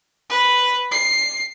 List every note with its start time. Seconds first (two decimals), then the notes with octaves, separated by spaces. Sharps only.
0.30 B4
0.91 C7